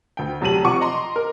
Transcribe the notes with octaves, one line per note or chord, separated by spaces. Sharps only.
D2 G5
F1 F#3 G4 A5 D#7 F#7
C3 F3 F#5 C#6 D6
D#5 A#5 C6
A#4